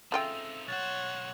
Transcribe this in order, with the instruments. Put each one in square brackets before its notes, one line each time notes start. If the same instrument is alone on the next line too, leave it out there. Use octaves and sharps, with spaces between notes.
[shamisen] C#3 F4 G5 [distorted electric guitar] C4 D#4 [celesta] A4 E5 E6
[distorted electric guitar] B1 C5 [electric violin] C#5 F#5 [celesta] A6